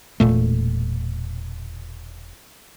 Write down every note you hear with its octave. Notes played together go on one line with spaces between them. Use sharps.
E1 A#2 A3